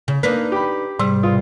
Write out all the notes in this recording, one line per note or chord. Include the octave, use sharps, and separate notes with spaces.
C#3
A#3 D4 D#4 B4
G4 B5
G#2 C3 G3
B2 F4